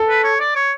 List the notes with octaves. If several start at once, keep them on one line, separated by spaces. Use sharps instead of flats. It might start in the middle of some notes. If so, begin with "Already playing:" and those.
Already playing: A4
B4
C#5
D5
C#5